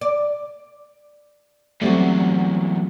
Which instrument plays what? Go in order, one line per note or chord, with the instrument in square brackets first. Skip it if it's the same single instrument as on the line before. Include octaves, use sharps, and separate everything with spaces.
[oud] D5
[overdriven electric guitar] E2 A#2 [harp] F#3 G3 [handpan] A3 C4